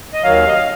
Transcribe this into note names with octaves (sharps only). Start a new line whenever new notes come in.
D#5
D#2 D#3 F#3 F5
D#5
F5